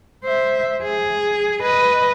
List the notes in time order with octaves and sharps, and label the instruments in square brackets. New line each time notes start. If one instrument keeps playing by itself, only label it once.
[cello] C5 E5
G#4
B4 D#5